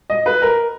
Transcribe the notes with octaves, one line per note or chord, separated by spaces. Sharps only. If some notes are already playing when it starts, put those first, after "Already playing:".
D#5
B4
A#4